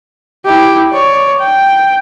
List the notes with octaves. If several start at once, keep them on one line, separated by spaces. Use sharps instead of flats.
E4 G4
C#5 D5
G5